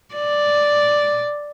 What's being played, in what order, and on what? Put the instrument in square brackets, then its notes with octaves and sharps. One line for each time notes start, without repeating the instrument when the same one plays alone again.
[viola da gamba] D5